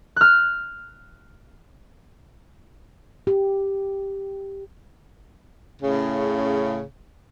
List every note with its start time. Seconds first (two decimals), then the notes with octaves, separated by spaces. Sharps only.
0.16 F6 F#6
3.27 G4
5.81 A2 C#3